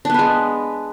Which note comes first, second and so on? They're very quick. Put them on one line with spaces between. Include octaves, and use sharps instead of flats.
D4 B3 B4 G#3